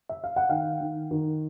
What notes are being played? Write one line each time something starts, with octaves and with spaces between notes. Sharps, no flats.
E5
F5
F#5
D#3 F5 G5
D#3
D#3